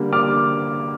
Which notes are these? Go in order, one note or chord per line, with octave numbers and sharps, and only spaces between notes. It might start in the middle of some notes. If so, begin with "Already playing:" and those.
Already playing: D3 G3 A#3
D6 F6